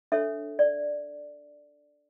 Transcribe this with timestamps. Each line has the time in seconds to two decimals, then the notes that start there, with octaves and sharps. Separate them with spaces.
0.12 D4 A4 C#5 E5
0.59 D5